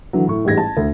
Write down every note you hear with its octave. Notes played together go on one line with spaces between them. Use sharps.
D3 E3 F#3
A2 C#6
A1 G#2 G3 G#4 G#6 A#6
A5
D2